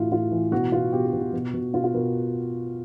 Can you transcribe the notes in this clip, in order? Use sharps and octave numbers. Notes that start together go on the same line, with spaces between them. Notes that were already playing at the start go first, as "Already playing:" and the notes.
Already playing: A2 E3 F4 F#4
A2 F4
E3
B2 F#4
B2 F4
B2 G4
F#4
B2
F#4
B2
B2
B2 F4
F4
B2 A#4